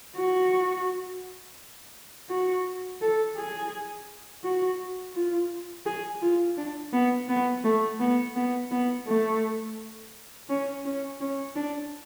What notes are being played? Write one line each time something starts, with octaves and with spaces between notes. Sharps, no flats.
F#4
F#4
A4
G#4
F#4
F4
G#4
F4
D4
B3
B3
A3
B3
B3
B3
A3
C#4
C#4
C#4
D4